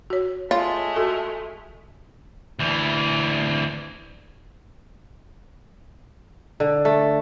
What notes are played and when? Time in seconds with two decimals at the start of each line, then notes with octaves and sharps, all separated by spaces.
0.10 F#4 C#5
0.51 G#3 A3 F4 C#5 C6
0.96 F#4 A4
2.59 D2 E3
6.60 D3
6.85 A3